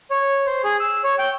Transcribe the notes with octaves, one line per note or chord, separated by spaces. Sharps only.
C#5
C5
G#4
E6
C#5
G5